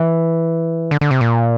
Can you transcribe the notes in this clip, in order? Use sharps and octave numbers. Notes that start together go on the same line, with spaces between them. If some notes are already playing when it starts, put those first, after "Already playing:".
Already playing: E3
D3
D3
C3
A#2